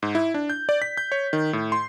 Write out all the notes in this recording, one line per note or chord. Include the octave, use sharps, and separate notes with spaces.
G#2
E4
D4
G6
D5
B6
G6
C#5
D#3
A2
C6